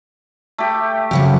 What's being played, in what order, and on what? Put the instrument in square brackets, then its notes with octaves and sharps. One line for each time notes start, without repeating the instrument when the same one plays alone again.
[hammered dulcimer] A3 G4
[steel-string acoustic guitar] F2 C#3 F#3